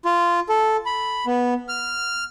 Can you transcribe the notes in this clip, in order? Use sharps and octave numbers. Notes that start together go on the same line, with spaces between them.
F4
A4
B5
B3
F6